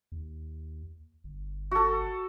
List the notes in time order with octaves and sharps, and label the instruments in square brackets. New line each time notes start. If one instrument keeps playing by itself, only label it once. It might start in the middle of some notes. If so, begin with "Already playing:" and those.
[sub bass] D#2
G1
[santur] F#4 A4